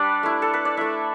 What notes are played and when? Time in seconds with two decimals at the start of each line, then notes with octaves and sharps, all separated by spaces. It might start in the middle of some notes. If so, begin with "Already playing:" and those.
Already playing: G3 D4 B4 D5
0.23 A3 E4
0.42 A4
0.53 B4
0.65 D5
0.77 A3 E4 E5